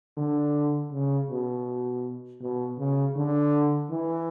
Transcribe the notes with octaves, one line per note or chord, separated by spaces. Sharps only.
D3
C#3
B2
B2
C#3
D3
E3